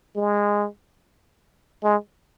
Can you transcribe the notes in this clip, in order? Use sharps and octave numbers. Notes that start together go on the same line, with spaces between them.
G#3
G#3